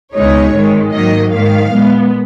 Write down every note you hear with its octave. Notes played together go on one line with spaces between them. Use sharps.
C#2 B2 G#3 D#4 C#5
G#1 G#2 D#3 G#3
G#2 D#3 F#3 A#3 D#5
G#2 D#3 A#3 F5
A#2 G#3 B3